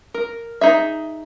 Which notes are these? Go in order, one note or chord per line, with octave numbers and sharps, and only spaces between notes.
A#4
D#4 G#4 E5